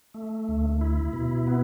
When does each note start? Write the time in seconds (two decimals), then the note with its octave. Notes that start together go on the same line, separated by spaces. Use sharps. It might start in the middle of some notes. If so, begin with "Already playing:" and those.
0.14 A3
0.48 D2
0.81 E4
1.13 B2
1.47 B3